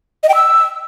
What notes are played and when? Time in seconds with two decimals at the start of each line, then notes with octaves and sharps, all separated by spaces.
0.23 D#5
0.29 G5
0.35 E6